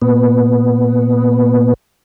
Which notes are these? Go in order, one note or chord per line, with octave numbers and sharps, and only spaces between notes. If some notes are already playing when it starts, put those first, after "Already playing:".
A#2 B3